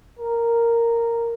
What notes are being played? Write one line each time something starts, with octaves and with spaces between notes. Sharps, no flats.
A#4